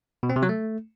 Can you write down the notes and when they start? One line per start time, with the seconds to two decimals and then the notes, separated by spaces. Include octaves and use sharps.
0.23 B2
0.30 C4
0.36 C3
0.43 F#3
0.49 A3